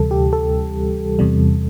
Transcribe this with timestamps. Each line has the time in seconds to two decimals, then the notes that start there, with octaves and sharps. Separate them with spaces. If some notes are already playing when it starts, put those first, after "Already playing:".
Already playing: D2 C3 E3 G3 A4
0.11 G4
0.33 A4
1.19 E2 C3 G3